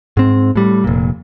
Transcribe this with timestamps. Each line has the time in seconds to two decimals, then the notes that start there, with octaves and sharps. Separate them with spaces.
0.17 G#2 C4
0.55 A2 G3
0.84 F1 A#2